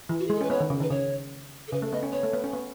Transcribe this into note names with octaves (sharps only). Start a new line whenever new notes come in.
E3
F#4
G#3 G#4
A4
C#4 B4
B3 C#5
D#3
C#3
D#3 B4
C#3 C#5
A4
C#3 B4
A3
B3 D#5
C#4
B3 C#5
A3
B3
C#4
B3